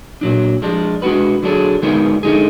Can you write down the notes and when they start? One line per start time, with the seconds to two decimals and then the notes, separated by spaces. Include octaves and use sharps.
0.21 A#2 F#3 D4
0.62 F3 G#3 D4
1.02 G#3 D4 F#4 B4
1.42 D3 F#3 D4 G#4
1.82 D3 G#3 B3 D#4 A#4
2.23 D3 G#3 D#4 G#4